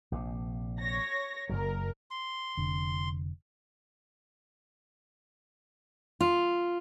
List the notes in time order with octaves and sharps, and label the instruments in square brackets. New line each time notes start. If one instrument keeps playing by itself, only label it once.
[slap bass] A#1 C3
[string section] C#5 A#6
[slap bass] F#1 B1 F#3 [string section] A#4
[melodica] C6
[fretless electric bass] F1 D3
[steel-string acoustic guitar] F4